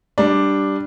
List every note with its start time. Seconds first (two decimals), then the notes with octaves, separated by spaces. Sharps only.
0.18 G3 D4